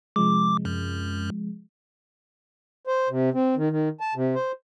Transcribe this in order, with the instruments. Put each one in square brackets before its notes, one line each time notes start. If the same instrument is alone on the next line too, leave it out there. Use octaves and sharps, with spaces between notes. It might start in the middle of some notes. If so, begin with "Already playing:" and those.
[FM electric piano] C3 F3 G#3 [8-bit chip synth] D6
[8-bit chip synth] F#2
[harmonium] C5
C3
C4
D#3
D#3
A5
C3
C5